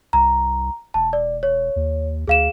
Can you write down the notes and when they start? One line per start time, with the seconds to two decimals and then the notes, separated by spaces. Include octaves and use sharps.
0.13 C2 A#5
0.94 E1 A5
1.13 D5
1.43 C#5
1.76 D#2
2.27 D2 G#4 F5 E7